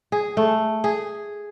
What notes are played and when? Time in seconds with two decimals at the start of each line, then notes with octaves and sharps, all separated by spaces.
0.12 G#4
0.37 A3
0.84 G#4